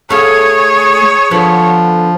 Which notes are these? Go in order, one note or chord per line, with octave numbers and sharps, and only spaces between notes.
A3 G#4 C#5 F5
D3 F3 B3